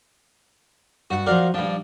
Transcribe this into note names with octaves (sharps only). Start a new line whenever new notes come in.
G2 F#4 F#5
F3 F#4 A#4 D5 F5 F#5
G2 F3 D4